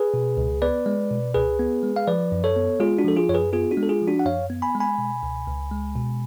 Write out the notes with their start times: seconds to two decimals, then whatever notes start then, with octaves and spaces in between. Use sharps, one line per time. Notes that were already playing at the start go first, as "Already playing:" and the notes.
Already playing: G#4 B4
0.14 B2
0.37 C#2
0.62 B3 B4 D5
0.86 G#3
1.10 B2
1.34 C#2 G#4 B4
1.59 B3
1.83 G#3
1.96 F5
2.07 F3 B4 D5
2.32 F#2
2.44 A4 C#5
2.56 B3
2.80 G#3 F4 G#4
2.98 D4 F#4
3.04 F3 A4
3.16 F4 G#4
3.29 F#2 C#5
3.34 G#4 B4
3.53 B3 F4 G#4
3.71 D4 F#4
3.77 G#3
3.83 A4
3.89 F4 G#4
4.02 F3
4.08 D4 F#4
4.19 F#5
4.26 F#2 C#5 F5
4.50 B3
4.62 G#5 B5
4.75 G#3
4.80 G#5 B5
4.98 B2
5.23 C#2
5.48 C#2
5.71 G#3
5.96 B2